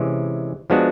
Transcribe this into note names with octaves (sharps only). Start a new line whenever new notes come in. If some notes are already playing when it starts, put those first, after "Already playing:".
Already playing: C3 E3 G#3 C#4
F3 G#3 B3 D4 F#4